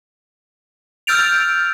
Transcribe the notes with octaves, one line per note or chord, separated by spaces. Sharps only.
E6 F6 G6 A6 D7 F7